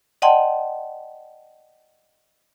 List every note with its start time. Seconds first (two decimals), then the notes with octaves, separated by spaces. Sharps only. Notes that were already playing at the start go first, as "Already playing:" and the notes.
0.22 D5 D#5 F#5 G5 A5 C6